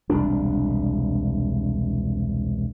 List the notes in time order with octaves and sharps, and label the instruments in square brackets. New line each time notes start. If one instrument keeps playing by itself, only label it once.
[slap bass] E1 C2 D4